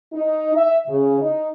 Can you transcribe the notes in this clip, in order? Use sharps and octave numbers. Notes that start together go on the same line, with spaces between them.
D#4
E5
C#3
D#4